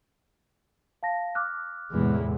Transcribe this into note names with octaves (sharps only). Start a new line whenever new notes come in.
F5 A5 A#6
D6 F6 F#6
E2 A2 C3 E3 G#3